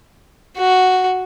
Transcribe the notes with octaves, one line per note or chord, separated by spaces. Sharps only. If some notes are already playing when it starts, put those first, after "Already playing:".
F#4